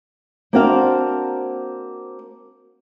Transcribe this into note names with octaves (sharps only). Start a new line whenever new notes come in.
A#3 C4 D4 F#4 C5 F5